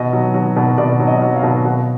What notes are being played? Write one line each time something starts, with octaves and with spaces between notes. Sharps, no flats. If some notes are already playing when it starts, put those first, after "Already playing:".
Already playing: B2 D#5
F#3
F#3
B2
B2 D5
F#3
D#5
F#3
F5
B2
B2 F#5